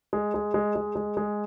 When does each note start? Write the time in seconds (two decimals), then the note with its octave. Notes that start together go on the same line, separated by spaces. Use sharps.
0.13 G#3
0.34 G#3
0.54 G#3
0.76 G#3
0.96 G#3
1.17 G#3